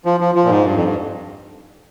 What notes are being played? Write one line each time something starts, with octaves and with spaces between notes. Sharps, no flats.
F3
F3
F3
A#2
G#2
G2
F2
G2